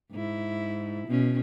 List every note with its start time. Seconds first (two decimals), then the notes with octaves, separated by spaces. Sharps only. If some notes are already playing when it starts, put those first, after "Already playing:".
0.11 G#2 E4
1.07 B2 C#4